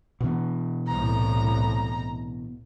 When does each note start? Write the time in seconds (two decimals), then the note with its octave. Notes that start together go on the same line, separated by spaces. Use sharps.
0.20 B2 E3 B3
0.87 C2 A2 A#5